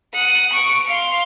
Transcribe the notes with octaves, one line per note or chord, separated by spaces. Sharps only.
F#5 D#6
C#6 D7
F5 C6